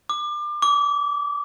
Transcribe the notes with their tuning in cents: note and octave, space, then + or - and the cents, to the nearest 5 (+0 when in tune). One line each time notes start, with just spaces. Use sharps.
D6 +30
D6 -30